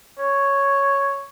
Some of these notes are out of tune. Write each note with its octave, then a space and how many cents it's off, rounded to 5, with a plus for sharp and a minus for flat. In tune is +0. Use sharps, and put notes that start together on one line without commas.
C#5 +0